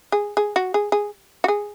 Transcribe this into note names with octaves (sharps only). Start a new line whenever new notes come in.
G#4
G#4
F#4
G#4
G#4
F#4
G#4